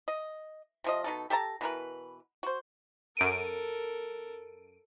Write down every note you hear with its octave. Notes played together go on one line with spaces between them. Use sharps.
D#5
C3 F3 D#5
B2 D#4 A4
G4 A4 A5 A#5
B2 E3 A#4 B4
F#4 C5
F#2 A4 A#4 D7 D#7